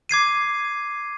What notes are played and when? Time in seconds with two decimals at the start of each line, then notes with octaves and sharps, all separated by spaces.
0.09 D6 G#6 C7 D#7